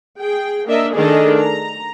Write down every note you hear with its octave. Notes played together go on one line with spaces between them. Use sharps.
G#4 G5
A#3 D4 A#4 D#5 E5
D#3 A3 D4 G#4 A4 D#5
A#5